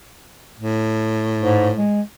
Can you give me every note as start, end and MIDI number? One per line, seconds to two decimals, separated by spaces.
0.59 1.85 45
1.40 1.70 44
1.77 2.01 56